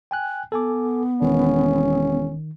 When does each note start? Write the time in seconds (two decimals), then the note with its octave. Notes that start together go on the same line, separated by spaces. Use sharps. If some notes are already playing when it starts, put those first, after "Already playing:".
0.11 G5 G#5 F#6
0.52 B3 A4 G#5 D6
1.22 E1 D#3 C#4